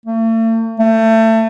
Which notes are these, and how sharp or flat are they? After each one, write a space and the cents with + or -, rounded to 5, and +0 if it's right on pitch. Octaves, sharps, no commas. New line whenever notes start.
A3 +45
A3 +25